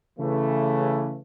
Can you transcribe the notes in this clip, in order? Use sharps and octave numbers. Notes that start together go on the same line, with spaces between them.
C#3 E3 A3